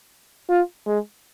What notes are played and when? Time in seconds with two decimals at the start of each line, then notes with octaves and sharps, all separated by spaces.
0.49 F4
0.87 G#3